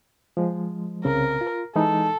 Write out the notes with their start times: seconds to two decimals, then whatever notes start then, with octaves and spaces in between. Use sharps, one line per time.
0.37 F3 G#3
1.05 C2 C#3 C4 A#4
1.41 F4
1.76 E3 G#3 D#4 A4